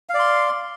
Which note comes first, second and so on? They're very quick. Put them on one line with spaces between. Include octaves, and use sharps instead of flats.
F5 D5 C6